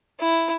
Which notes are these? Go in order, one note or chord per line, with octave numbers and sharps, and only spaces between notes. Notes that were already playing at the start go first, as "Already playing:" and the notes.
E4